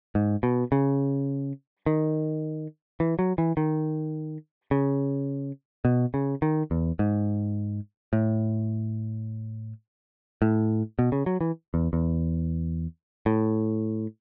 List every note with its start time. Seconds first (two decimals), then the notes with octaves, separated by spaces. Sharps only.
0.15 G#2
0.43 B2
0.72 C#3
1.86 D#3
3.00 E3
3.19 F#3
3.38 E3
3.57 D#3
4.71 C#3
5.85 B2
6.14 C#3
6.42 D#3
6.71 E2
6.99 G#2
8.13 A2
10.42 A2
10.99 B2
11.12 C#3
11.26 F#3
11.41 E3
11.74 E2
11.93 E2
13.26 A2